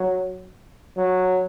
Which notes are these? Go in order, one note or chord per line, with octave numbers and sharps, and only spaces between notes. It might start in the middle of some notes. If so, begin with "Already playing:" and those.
Already playing: F#3
F#3